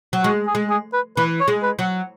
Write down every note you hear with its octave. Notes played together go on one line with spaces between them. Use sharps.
F#3
G#3 F#4
G#4
G#3
G#4
B4
E3 B4
C#5
G#3
B4
F#3